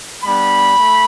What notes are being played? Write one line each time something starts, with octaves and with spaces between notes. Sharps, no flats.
G3 B3 D4 B5
A3